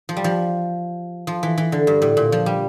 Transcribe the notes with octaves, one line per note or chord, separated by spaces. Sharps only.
F3
G3
F3
F3
E3
E3
D3
G2
A2
A#2
F3
G3